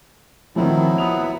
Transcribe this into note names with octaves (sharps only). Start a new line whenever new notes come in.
D#3 F3 F#3 C4 E4
B3 D#6 F7